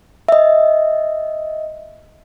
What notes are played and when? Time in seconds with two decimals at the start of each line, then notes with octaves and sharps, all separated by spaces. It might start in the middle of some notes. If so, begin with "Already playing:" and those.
0.29 D#5 E5